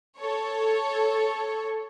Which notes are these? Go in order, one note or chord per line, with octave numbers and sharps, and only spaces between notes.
A4 C#5